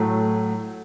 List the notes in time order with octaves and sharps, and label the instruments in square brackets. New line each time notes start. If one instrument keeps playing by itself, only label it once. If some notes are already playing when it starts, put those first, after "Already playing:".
Already playing: [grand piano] A2 F#3 A3